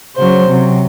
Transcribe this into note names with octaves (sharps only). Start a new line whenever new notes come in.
C#3 F#3 C5
C3 F#3